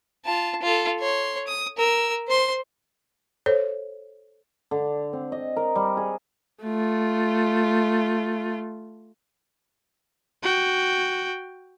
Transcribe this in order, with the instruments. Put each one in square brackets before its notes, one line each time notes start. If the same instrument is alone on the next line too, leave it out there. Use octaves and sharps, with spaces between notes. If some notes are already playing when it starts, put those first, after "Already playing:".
[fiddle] F4 A5
F4 A4
C#5 C6
D#6
A#4 E6
C5 C6
[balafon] A4 C5 C#5
[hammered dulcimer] D3
C4
D#5
A#4
G3
G#4
[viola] A3 F4
[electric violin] F#4 G5